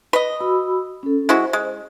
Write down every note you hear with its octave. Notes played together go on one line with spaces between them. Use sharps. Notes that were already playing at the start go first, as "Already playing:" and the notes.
B4 D#5
F#4 B5 E6
C#4 A4
G#3 E4 F#4 C5
G#3